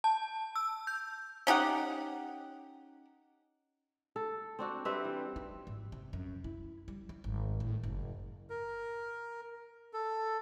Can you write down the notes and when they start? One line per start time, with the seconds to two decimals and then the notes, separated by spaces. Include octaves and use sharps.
0.04 A5
0.56 E6
0.87 G6
1.47 C#4 D#4 G4 F#5
4.16 A4
4.59 C4 D4 F#4
4.85 G3 C4 B4 E5
5.04 E3
5.36 D#4
5.67 G#1
5.92 C3
6.13 F#2
6.44 E4
6.88 G3
7.09 G3
7.24 G#1
7.60 A2
7.83 F#1
8.50 A#4
9.93 A4